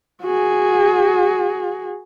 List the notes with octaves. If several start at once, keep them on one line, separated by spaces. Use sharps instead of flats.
F#4 G#4